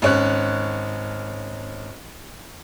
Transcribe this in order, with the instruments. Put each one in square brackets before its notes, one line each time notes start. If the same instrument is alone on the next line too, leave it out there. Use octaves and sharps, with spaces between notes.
[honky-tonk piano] G#1 C#4 F#6